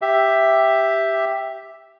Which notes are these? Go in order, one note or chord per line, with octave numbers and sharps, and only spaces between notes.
G4 E5